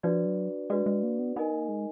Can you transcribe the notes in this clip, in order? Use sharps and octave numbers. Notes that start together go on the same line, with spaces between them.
F3 D4 F#4 B4 D5
F#3
G#3 D4 F#4 B4 D5
G#3
A#3
B3
B3 D#4 A#4 D#5 G#5
A#3
G#3